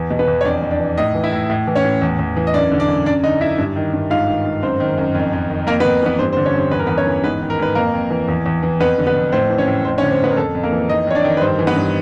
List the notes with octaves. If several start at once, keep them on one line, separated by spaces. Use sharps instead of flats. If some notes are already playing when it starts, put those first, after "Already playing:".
Already playing: E2 E3
B2
B3 B4
E2
C#5
F2 D4 D5
F2
D4 D5
E3
A2 D#4 D#5
E3
E4 E5
A2
A2
E3
C#4 C#5
A2
E2
E2
E3
D#5
F#2 D4 D5
D3
D4 D5
F#2
F#2 D4 D5
D3 D#4 D#5
F#2 E4 E5
G2
D#3
G2
G#2 F4 F5
D#3
G#2
F#2 C4 C5
D#3
F#2
F2
F2
D#3
F2 A#3 A#4
B3 B4
F2
E3 B3 B4
G2 C4 C5
C4 C5
D3
C#4 C#5
G2 C4 C5
E2 B4
A#4
E2 B3 B4
C#4 C#5
E3
G#2 B3 B4
D#3
A#4
G#2 B4
F2 A#3 A#4
F2
E3
E2
E2
E3
F2 B3 B4
D3
B3 B4
F2
A2 C4 C5
E3
C#4 C#5
A2
F2 C4 C5
C#4 C#5
D3
C4 C5
F2 B3 B4
A#4
F2 A4
F2
A#3 A#4
E3
F2 D#4 D#5
F2 C#5
D4 D5
D#3
B4
G2 C4 C5
E3
B3 B4
G2